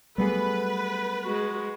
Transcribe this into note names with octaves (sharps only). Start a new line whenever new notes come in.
F#3 G3 A3 B3 G#4 B4
G#3 F#4